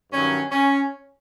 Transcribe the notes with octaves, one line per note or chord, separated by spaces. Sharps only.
G2 D#3 F#3 C#4
C#4